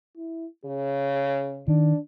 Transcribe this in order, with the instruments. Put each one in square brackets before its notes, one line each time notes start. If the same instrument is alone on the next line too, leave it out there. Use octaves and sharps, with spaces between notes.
[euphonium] E4
[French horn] C#3 [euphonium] G#4
[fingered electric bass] D#3 [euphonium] D4